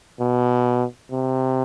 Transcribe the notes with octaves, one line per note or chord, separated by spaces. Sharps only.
B2
C3